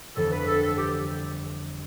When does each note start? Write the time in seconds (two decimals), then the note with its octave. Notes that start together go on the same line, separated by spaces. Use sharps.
0.16 G1 F2 E3 B3 E4 A4
0.31 B4
0.47 A4
0.62 A4
0.77 G4